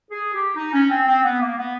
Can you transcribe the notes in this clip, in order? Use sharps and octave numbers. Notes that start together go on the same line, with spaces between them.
G#4
G4
D#4
C#4
C4
C4
B3
A#3
B3